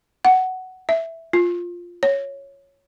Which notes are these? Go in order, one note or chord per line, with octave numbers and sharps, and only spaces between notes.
F#5
E5
F4
C#5